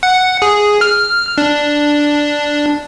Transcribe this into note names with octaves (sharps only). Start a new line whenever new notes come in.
F#5
G#4
F6
D4